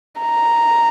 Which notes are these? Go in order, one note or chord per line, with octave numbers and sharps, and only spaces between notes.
A#5